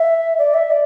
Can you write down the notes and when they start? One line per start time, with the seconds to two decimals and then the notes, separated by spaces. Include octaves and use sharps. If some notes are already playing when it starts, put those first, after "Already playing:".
Already playing: E5
0.38 D5
0.54 E5
0.70 D5